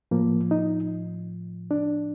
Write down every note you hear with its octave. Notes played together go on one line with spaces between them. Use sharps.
A2 F3 A#3
D#4
D4